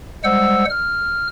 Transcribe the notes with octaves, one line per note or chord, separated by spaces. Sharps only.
G3 G#3 C5 F#5 E6
F6